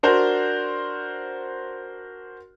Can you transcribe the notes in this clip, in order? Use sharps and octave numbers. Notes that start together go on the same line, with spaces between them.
D4 F#4 A#4 C5